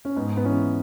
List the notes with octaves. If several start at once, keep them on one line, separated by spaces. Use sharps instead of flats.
C#4
G#2 B3
B3
E3 G#3 C#4